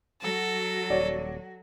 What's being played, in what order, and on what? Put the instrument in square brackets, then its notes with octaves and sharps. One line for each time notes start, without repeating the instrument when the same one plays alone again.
[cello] F#3 F#4 [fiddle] A4
[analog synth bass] D#1 [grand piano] C#5 D5